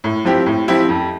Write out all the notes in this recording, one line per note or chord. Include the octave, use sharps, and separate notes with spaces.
A2
F3 C4 E4 G4
A2
F3 C4 E4 G4
F2